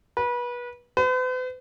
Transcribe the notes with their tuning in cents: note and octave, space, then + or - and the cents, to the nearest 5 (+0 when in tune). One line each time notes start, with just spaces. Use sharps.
B4 -30
B4 +45